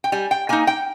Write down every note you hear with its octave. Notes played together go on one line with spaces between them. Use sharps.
G5
G3 G#5
G5
A#3 D#4 G#5
G5